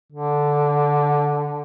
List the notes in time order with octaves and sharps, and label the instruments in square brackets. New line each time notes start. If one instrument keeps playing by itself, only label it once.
[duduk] D3